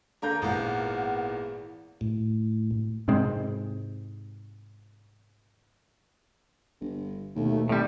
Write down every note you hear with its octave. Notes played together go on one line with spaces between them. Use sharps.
D3 A#3 A#5 G6
G#1 E2 A#2 F#5
A2
G#2 C3 G#3 C4
G1
D#2 B2 A3
G#1 A2 G3 D5